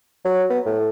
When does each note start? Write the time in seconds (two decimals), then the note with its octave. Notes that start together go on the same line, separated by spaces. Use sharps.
0.25 F#3
0.50 B3
0.66 A2